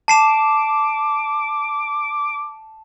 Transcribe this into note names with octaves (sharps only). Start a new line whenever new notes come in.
A5 D6 C7 E7